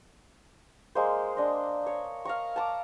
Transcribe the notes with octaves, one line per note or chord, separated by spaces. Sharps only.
G#3 A#3 C5
D4 D#5
C#5
F5 A#5 C#6
A5 A#5 D6